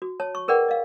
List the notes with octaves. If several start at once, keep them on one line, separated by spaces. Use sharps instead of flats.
F#4
C#5 A5
C#6
G#4 A#4 B4 D5 F#5 G5
D#5 F5